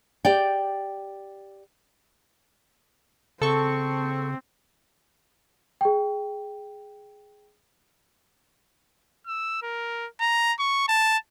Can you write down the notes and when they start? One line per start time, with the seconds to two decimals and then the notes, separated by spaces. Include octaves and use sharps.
0.25 G4 D5 G5
3.41 C#3 C4 A4 C#6
5.81 G#4 G5
9.27 E6
9.63 A#4
10.20 A#5
10.59 C#6
10.88 A5